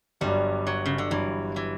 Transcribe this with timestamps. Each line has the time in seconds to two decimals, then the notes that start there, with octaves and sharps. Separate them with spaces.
0.21 G1 G2 F#3 G3
0.67 F#3
0.86 C#3
0.98 D3
1.11 G1 G2 E3 F#3
1.56 E3